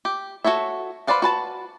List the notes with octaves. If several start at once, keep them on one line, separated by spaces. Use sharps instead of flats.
G4
F#4 A4 C#5 E5
B4 C5 D5 F5 F#5
F#4 B4 A5